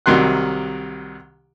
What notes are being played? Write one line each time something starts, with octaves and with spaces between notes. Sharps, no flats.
C2 C3 D#3 F#3 C6 F#6